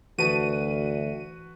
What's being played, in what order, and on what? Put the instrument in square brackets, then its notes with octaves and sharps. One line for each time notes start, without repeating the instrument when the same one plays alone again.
[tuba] D2 [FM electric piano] E3 [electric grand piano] F#4 B4 A5 [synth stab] D#7